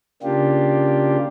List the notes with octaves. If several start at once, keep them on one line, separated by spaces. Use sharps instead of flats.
C#3 A#3 D4 F4 G4